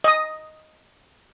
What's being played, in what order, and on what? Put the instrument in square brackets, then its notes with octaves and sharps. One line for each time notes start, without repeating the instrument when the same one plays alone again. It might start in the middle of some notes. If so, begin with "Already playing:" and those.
[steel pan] D#5 D#6